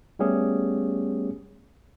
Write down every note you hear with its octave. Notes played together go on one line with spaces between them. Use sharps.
G3 A3 B3 C#4 G4 G#4